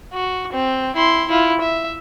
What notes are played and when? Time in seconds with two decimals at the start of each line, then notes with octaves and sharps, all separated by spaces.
0.13 F#4
0.52 C4
0.96 E4 C6
1.28 E4 F4
1.60 E5